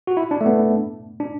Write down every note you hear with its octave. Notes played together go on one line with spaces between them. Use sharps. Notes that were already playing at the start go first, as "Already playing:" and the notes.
F#4
E4
D4
A3
B3
D4